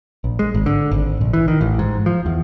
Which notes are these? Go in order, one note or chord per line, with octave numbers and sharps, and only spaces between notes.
A#1
G#3
G#1
D3
G#1
A#1
E3
D#3
A1
G#2
F3
E2